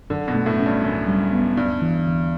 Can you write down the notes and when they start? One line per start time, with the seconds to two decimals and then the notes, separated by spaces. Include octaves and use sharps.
0.10 F#2 D3
0.28 B2
0.35 A3
0.46 A2
0.59 C#4
0.66 G2
0.84 C#2 F#2
1.08 G3
1.32 B3
1.57 D2 G2
1.82 E3
2.06 D2